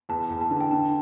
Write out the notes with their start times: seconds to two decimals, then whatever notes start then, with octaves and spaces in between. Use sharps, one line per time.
0.09 E2 A5
0.30 E2
0.41 A5
0.51 D3
0.61 G5
0.71 D3 A5